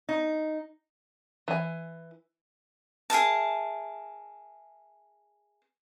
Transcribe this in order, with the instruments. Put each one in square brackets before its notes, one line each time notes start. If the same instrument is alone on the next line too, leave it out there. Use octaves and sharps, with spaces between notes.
[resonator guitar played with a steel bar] D#4
[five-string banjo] E3 G#5
[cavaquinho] G#4 A#4 E5 A5